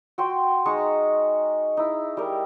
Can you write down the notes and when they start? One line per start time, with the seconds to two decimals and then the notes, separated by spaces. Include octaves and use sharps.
0.18 F#4 G5 C6
0.66 G#3 D#4 A#5 C#6
1.77 D#4 E4
2.17 G3 A#4